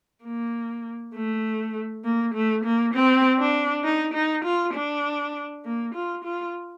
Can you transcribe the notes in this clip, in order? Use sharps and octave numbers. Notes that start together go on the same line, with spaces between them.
A#3
A3
A#3
A3
A#3
C4
D4
D#4
D#4
F4
D4
A#3
F4
F4